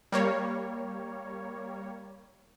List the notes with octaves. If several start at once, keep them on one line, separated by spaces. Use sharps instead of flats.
G3 A#3 C#5